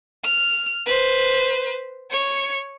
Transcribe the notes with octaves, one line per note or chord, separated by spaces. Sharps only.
F6
B4 C5
C#5 C#7